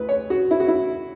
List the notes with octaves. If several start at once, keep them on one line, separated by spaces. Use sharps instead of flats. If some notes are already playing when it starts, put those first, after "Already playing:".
Already playing: D2 E3 B4
C#5
F#4
E4
F#4
E4